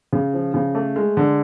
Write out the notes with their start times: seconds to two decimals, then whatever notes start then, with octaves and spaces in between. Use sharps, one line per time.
0.13 C#3
0.34 F3
0.54 C#3
0.75 A3
0.96 G#3
1.17 D3